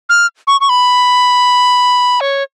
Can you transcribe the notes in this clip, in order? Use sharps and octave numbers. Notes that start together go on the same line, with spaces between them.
F6
C#6
C#6
B5
C#5